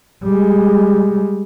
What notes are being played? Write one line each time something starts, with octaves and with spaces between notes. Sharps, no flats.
G3 G#3